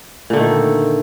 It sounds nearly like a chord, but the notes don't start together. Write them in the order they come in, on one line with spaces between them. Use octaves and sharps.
A#2 D3 A3 D#3